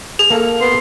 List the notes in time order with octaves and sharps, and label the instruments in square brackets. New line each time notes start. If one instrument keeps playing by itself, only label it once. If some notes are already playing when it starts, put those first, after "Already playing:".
[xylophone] G#4
[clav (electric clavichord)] A#3 A4 F5
[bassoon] B3 [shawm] C6